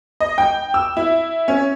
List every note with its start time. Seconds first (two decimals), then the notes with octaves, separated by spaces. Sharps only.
0.20 D#5
0.38 G5
0.74 E6
0.97 E4
1.48 C#4